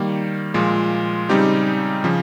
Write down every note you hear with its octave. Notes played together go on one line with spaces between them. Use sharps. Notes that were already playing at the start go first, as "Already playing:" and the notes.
Already playing: D#3 G3 A#3
A#2 F3 G#3 F4
C#3 G3 C4 D#4 G4
C#3 F3